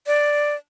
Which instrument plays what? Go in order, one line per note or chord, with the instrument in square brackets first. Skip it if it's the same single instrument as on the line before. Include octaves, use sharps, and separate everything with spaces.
[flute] D5